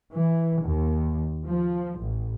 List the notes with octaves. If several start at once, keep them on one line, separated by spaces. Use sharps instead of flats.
E3
D#2
F3
A1